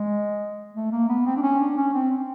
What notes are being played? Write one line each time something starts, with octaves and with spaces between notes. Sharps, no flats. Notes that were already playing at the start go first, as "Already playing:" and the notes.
Already playing: G#3
A3
A#3
B3
C4
D4
C#4
D4
C#4
C4